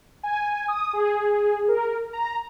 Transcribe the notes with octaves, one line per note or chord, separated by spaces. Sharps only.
G#5
D#6
G#4
A#4
A#5